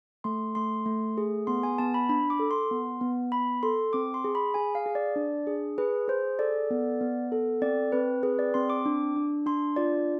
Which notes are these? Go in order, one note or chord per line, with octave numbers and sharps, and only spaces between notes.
A3 C6
A3 C6
A3
G#4
B3 C6
G#5
B3 A5
B5
D4 B5
D6
A4
C6
B3
B3
B3 B5
A4 C6
C4 D6
C6
G#4
B5
G#4 G#5
F5
G#4
D5
D4
G#4
G#4 B4
G#4 C5
A4 D5
B3
B3
A4
C4 D5
C4 B4
G#4 B4
D5
C4 C6
D6
D4
D4
D4 C6
F4 D5